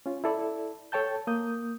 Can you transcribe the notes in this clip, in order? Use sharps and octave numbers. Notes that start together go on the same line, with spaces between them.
C#4 F4
E4 A4 D5
A4 C#5 G5 A5 G6
A#3 D#6 G6